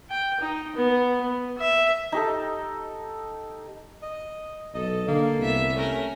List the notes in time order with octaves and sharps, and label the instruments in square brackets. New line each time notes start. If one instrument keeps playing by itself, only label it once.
[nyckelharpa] G5
D#4
B3
B3
E5
[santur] D#4 G4 A4
[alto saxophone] D#5
[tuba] B1 [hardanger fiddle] A4 [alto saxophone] D#5
[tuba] D3 [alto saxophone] A#3
[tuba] C2 [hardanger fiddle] B3 E5
[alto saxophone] A3 [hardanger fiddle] C#4 A#4